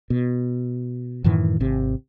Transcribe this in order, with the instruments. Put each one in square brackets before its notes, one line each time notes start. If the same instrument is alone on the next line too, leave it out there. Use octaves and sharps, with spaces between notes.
[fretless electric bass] B2
F#2 A2 D#3 E3
G#1 C3